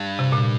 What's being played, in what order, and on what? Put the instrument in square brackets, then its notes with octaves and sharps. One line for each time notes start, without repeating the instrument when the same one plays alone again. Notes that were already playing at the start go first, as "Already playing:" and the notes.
Already playing: [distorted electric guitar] G2
[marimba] C3
A#2